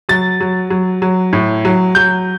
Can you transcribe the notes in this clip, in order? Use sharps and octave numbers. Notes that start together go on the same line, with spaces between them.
F#3 A6
F#3
F#3
F#3
A2
F#3
F#3 G6